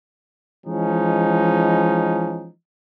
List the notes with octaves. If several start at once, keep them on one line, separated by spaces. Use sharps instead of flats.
E3 F3 G#3 C#4 D#4